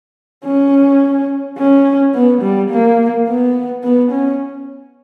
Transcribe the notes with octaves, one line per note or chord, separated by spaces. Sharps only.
C#4
C#4
B3
G3
A#3
B3
B3
C#4